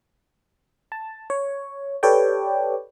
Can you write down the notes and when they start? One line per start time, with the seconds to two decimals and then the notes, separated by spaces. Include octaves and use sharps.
0.92 A5
1.30 C#5
2.03 G4 A4 B4 C#5 D5 G5